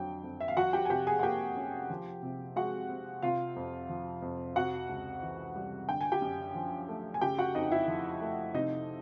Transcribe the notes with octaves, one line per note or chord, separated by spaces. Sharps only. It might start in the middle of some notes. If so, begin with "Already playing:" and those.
Already playing: F2 D3 F#3 G5
F2
E5
F5
F3 F#4 F#5
G4 G5
G#5
C3 G4 G5
G#4 G#5
F#5
A#3 G4 G5
C#4
F3
C3
G#3 F#4 F#5
C4
C3 F4 F5
F2
F3
F2
C3 F#4 F#5
C#2
E3
G3
D3 G5
G#5
G4 G5
F#2
F3
A3
G#5
C#3 G4 G5
F#4 F#5
F2 D#4 D#5
E4 E5
F3
A3
C3 D#4 D#5